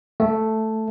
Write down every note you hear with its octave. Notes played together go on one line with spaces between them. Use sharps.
A3